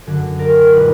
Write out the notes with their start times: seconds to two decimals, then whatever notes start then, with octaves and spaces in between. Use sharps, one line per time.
0.06 F#2 D3 F#3 D4
0.39 A#4 D5
0.73 A#2 F3 G#3 D#4 B4